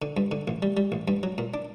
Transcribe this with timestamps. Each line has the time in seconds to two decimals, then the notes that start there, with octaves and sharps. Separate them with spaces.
0.02 D3
0.17 G2
0.31 D3
0.48 A1
0.62 G3
0.77 G3
0.92 A1
1.08 G2
1.23 F#3
1.38 A#2
1.54 D4